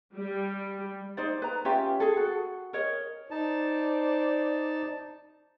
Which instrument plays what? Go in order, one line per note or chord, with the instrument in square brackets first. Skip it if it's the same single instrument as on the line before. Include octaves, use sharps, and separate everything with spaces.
[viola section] G3
[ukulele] D#4 C5 D5
B4 A#5
C#4 F4 G4 E5
G#4 A4
F#4 A4
A#4 C#5 D#5
[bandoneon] D#4 A5 [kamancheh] C5 D5